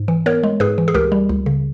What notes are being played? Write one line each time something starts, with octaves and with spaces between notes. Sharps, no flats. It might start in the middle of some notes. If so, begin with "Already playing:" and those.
Already playing: G#2
E3
B3 A#4 C#5
G#3
G#2 G#4 B4
E3
G#4
C#2 G4 A#4
G3
C#2
C#3